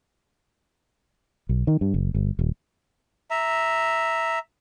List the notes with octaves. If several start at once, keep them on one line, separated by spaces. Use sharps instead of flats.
B1
D#3
G2
F#1
G1
D#1
E5 A#5